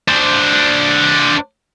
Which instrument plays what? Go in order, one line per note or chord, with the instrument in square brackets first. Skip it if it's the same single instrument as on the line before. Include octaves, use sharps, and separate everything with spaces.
[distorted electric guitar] D4 C5